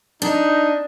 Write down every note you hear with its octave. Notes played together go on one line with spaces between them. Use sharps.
D4 D#4